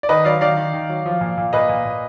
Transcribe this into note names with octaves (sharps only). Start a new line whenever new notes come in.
D5
D#3 B4 D#5
F#3 D5 F5
D#3 D5 F5
D#3
D#3
F#3
F3
A#2
A#2
A#2 B4 D#5
A#2
A#2